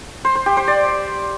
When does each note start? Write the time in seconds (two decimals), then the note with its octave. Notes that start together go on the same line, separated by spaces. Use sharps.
0.25 C5
0.35 C5
0.46 G4
0.57 C5
0.68 D5